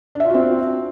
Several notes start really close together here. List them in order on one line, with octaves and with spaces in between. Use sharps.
D4 E5 F4 F#4 C4